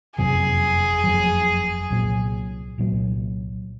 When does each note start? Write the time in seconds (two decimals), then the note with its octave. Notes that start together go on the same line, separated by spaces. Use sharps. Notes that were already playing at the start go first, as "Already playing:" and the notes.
0.17 F#1 F2 C3 F#3 G#4
1.04 F#1 F2 C3 F#3
1.90 C2 A#2 F#3
2.78 C2 A#2 F#3